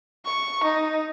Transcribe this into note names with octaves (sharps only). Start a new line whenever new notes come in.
C#6
D#4